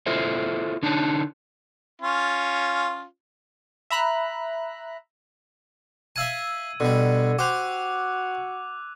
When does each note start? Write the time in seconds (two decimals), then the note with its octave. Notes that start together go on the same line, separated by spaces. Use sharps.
0.06 E4 F4 A4 C5 E5
0.83 D3 D4 D#4 C#5 A5
2.02 C#4 F4
3.90 E5 A#5 B5 F#6
6.16 E5 F5 A5 E6 G#6 D#7
6.80 B2 D3 G3
7.39 F#4 G4 C5 D6 F#6 F7